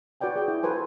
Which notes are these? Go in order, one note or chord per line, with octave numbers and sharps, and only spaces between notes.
F#4 B4 D5 G5 G#5
G#4 G5
E4
F#4 A4 B4 C5 G#5